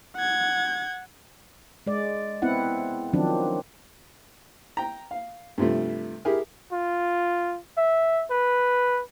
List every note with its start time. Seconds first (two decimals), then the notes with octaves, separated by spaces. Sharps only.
0.16 F#5 G#6
1.87 G#3 D5
2.42 B3 C4 E4 F#5
3.13 D#3 F3 F#3 C4 D4
4.77 G5 A#5
5.11 F5
5.58 G2 C3 F3 A3
6.25 E4 G4 G#4 A#4
6.72 F4
7.77 E5
8.31 B4